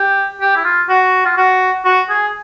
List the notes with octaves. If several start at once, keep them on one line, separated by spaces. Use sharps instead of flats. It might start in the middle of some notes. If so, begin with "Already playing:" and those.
Already playing: G4
G4
E4
F4
F#4
F4
F#4
F#4
G#4